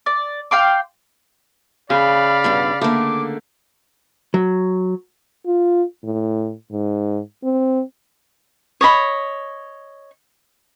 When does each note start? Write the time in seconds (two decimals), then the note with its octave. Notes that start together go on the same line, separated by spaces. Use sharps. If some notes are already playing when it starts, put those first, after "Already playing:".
0.06 D5
0.51 F5 G5 C6 D6
1.90 C#3 D5 F5 B5
2.44 G2 B2 G3
2.81 D3 A3 A#3 D6
4.34 F#3
5.46 F4
6.03 A2
6.71 G#2
7.44 C4
8.81 C#5 D#5 B5